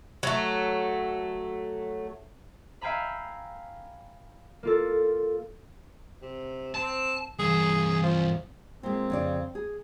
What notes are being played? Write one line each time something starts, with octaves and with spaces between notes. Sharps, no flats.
F#3 A3
E5 F5 G5 G#5 A#5 B5
A#3 F4 A4
C3
C4 A5
G2 E3 G#4
F3
A#2 G#3 C4
F2 C#3 D5
G#4